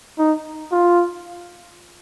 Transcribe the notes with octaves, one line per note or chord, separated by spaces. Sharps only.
D#4
F4